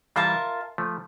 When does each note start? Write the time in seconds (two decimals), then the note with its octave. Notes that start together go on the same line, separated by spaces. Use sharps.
0.16 E3 G3 F4 A#4 E5 A5
0.78 F3 A3